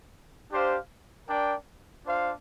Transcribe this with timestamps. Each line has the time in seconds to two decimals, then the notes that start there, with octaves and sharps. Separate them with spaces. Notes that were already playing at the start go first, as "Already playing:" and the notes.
0.52 D4 G4 C5 F5
1.29 D4 A#4 D5 G5
2.06 D4 F4 C5 F5